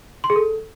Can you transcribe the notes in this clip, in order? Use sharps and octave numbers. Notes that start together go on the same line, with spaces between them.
C6
G#4
A4